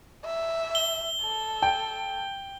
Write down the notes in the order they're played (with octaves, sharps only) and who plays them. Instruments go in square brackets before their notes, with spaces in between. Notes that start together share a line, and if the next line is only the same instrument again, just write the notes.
[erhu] E5
[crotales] G7
[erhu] A4
[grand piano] G5